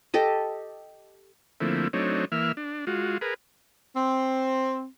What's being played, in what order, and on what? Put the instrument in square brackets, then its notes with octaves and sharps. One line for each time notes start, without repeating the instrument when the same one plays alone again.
[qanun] G4 A4 D#5
[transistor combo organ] D3 F3 A3 A#3 C4 E4
F#3 A3 C4 D4 D#4 C#5
E3 A#3 E5 F6
D4
G#3 F4 F#4
G#4 A#4 B4
[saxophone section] C4